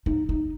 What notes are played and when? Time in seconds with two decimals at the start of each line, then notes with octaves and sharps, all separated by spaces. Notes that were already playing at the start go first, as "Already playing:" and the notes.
0.06 D#4
0.29 D#4